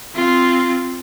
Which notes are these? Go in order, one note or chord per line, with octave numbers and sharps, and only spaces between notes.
C4 F4